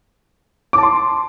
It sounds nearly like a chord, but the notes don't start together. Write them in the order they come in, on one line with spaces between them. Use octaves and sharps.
D6 A5 C6